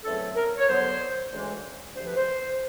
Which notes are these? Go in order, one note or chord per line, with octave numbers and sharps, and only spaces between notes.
E2 C#3 F#3 A3 C4 A4
A#4
C#5
G2 D3 F#3 B3 C5
D2 C#3 E3 G#3
D2 C3 F3 C5
B4
C5